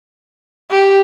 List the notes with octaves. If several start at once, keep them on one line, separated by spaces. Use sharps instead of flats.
G4